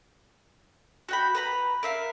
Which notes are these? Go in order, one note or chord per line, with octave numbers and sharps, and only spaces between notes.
F#4 G5 B5
B4 A#5 B5
A#4 E5 F5